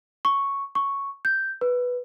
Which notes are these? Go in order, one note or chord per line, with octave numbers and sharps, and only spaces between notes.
C#6
C#6
G6
B4